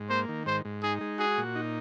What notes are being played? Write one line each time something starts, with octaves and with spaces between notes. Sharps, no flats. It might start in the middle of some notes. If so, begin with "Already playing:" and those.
Already playing: G#2
A#3 C5
D#3
G#2 C5
G#2
D#4 G#4
G#3
F#4 G#4
A#2
D#4